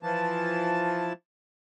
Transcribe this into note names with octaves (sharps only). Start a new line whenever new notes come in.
E3 F3 A5